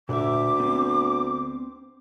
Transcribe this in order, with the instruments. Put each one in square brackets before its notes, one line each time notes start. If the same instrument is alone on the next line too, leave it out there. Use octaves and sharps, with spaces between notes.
[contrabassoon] D2 [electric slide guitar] A#2 B4 E5 [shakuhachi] D6
[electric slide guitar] B3 C4